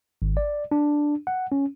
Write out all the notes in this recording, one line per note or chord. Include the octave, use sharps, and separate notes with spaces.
G#1
D5
D4
F#5
C#4